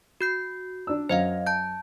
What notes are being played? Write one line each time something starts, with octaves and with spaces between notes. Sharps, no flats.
F#4 G6 C7
D4 E6
F#2 C5 D#5 F5
A5 G6